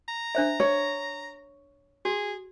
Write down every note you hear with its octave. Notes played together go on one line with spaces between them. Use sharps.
A#5
D4 C5 E5
C#5
F#4 G#4